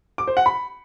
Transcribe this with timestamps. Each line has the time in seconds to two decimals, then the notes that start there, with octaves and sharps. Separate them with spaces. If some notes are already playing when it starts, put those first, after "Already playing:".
0.18 D6
0.27 C5
0.37 F#5
0.46 B5